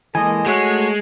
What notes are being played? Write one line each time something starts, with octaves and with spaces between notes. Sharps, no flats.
E3 G#3 A#3 G#4 A4 D#5 G#5
G#3 A3 F#4 C#5 E5 F#6